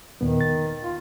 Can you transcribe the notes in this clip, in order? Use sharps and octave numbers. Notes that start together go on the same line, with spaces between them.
D#2 A#2 D#3 B3
A6
F4